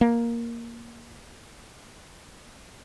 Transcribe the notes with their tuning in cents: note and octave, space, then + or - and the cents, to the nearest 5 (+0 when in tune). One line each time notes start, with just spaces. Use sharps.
A#3 +5